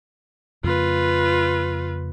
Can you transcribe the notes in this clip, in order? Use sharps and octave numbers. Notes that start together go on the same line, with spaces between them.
F2 C#3 A#3 F4 B4